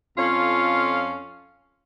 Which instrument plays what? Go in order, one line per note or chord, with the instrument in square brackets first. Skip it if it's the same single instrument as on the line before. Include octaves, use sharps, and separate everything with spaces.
[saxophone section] F2 C#4 F4 A4 F5